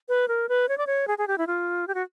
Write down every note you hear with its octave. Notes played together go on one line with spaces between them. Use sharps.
B4
A#4
B4
C#5
D5
C#5
G#4
G#4
G4
E4
F4
G4
F#4